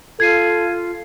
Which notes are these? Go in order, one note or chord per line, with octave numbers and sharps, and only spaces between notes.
F4 A4 G#6 C7 D#7